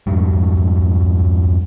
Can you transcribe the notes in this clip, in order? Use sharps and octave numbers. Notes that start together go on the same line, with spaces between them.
F2 G#2 G3